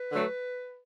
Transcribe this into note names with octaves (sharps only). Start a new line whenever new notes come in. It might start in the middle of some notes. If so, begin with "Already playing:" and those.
Already playing: B4
D3 F#3 A3